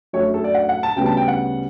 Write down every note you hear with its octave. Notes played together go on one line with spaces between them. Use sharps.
F#2 D3 F#3 A3 C#5
A4
D5
F#5
F#5
A5
D2 C#3 G3 B3 G5
A5
G5
F#5